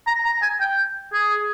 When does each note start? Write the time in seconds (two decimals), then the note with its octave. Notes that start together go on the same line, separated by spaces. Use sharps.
0.07 A#5
0.25 A#5
0.42 G#5
0.60 G5
1.13 G#4